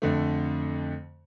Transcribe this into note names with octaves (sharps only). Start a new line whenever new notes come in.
F2 D3 A3